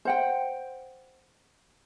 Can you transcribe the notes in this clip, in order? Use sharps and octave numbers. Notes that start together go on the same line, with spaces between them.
C5 F#5 G5